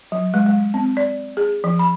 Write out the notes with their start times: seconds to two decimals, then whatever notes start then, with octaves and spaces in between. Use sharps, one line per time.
0.12 F#3
0.34 G#3
0.46 G#3
0.74 C4
0.97 D5
1.37 G#4
1.64 F3
1.79 B5